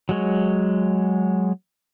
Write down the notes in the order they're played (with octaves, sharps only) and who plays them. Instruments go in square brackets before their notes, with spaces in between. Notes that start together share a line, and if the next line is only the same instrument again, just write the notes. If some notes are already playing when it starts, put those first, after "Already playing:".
[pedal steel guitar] F#3 G#3 C#5